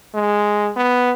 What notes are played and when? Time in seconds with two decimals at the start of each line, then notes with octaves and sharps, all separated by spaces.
0.14 G#3
0.77 B3